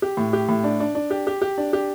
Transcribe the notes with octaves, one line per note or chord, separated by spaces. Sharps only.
G4
A2
G4
A2
D4
D4
D4
G4
G4
G4
D4
G4